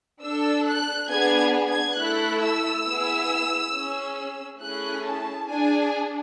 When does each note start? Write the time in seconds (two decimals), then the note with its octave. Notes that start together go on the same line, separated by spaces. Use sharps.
0.23 D4 A4 E6
0.67 F#6
1.10 B3 D4 G#4 G#6
1.69 G#6
1.98 A3 E4 A4 F#6
2.42 E6
2.86 B3 E4 G#4
3.73 C#4 G#4
4.61 A3 C#4 E4 G#4 F#6
5.05 A5
5.49 D4 G#4 G#5